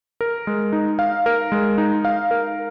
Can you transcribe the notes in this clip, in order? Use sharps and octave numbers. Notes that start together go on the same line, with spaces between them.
A#4
G#3
D#4
F5
A#4
G#3
D#4
F5
A#4